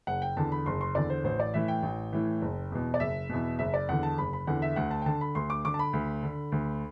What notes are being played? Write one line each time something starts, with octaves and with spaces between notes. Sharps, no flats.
F#1 F#5
G5
E2 D3 A5
B5
F#1 C6
C6
E2 D3 D5
C5
A1 C5
D5
A2 E3 E5
G5
A1
A2 E3
F#1
E2 B2
D5
F#1 E5
E2 B2
F#1 E5
D5
E2 D3 F#5
A5
F#1 B5
B5
E2 D3 F#5
E5
D2 F#5
A5
G5
D3 A5
B5
D2 C6
D6
D3 D6
A5
B5
D2
D3
D2